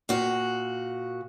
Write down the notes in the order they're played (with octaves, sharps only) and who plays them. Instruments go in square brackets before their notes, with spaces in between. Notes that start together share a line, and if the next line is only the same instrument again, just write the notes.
[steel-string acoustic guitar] A#2 F#4